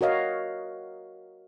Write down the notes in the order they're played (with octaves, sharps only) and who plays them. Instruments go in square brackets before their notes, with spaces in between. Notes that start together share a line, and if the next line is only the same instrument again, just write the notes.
[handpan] F#4 A#4 C#5 D#5 F5